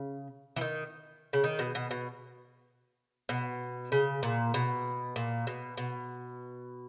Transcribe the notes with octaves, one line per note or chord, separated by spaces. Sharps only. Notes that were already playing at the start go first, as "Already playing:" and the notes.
Already playing: C#3
E3
D#3
C#3
D#3
B2
B2
B2
B2
C#3
A#2
B2
A#2
B2
B2